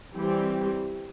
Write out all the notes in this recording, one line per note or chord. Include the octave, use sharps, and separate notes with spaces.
E3 G3 C4 G4